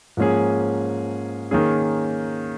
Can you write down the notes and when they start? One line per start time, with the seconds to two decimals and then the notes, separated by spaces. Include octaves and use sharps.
0.17 G#2 F3 A#3 C#4 G#4
1.51 D#3 A#3 C#4 G#4